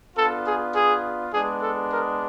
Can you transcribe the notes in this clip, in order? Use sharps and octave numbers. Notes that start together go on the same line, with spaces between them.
B3 D4 F4 A4
G#4
G#4
G#3 B3 D4 G#4
A4
A#4